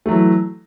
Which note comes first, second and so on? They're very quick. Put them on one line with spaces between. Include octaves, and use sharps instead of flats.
A3 F#3 E3